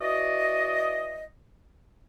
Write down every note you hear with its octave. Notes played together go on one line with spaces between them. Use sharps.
E3 F#4 D5 D#5